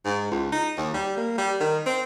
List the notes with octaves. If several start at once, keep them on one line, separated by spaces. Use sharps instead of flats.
G#2
C#2
D#4
D#2
G3
A#3
G3
D#3
C4